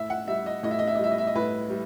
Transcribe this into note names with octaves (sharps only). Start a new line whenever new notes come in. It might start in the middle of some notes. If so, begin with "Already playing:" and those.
Already playing: A2 E5
F#5
G3 E5
D#5
A2 D#5
E5
D#5
E5
D#5
G3 E5
D#5
E5
D#5
A2 B4
G3